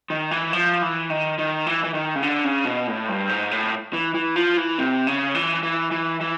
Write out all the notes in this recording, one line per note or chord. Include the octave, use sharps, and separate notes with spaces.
D#3
E3
F3
E3
D#3
D#3
E3
E3
D#3
C#3
D3
C#3
B2
A2
G2
G#2
A2
E3
E3
F3
E3
C3
C#3
E3
E3
E3
E3